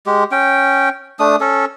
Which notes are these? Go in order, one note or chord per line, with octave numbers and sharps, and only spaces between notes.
G#3 G4
C#4 G5
A3 D4 D#6
C#4 A4